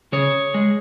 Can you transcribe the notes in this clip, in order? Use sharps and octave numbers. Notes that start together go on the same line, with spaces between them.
C#3 G#4 C#5
G#3